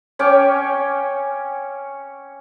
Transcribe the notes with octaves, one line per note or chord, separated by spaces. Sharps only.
C#4 C#5 G5 D6